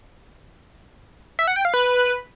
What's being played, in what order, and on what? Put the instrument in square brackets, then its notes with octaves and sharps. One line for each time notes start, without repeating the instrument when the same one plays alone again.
[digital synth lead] E5
F#5
G5
F5
B4